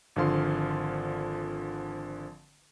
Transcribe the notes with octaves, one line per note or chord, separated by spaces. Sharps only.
G#1 D3 F3 F5 C6